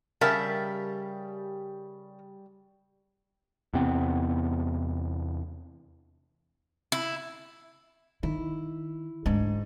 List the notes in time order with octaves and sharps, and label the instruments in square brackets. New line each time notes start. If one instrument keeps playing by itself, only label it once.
[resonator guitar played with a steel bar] C#3 A#4 E5 [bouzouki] G3 A5
[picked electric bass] E2 C3 B3 C4
[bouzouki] E4
[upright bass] D#3 [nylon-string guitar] E4
[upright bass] D2 D4 [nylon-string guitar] G#2